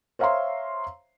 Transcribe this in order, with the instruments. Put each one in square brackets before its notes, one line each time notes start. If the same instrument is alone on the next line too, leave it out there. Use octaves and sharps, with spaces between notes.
[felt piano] C5 C#5 E5 F5 A#5 C6